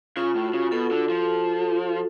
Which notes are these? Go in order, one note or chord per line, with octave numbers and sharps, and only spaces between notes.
C#3 F4
A2
F#4
C#3
B2 A4
D3
F3